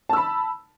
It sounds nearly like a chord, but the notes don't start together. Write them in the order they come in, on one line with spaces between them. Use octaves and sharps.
A5 E6 B5